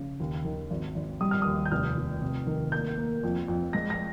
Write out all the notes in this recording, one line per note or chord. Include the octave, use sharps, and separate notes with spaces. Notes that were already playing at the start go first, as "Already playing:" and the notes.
Already playing: C#3
D#2
D#3
G#1
G#1
G3 D#6
F6
D#2 D#6
G6
F1 F6
F1
C3
D#3
A#3 G6
A#3
F2
F2
G#3 A#6
A#6